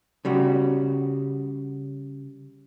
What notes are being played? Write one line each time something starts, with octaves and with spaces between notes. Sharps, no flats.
C#3 G3 F#4